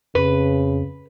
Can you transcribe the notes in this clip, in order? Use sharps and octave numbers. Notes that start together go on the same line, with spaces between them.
F2 C#3 B4